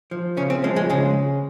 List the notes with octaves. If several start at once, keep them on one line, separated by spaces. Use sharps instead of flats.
F3
C#3 C#4
C4
F3 G#3
G#3
C#3 G#3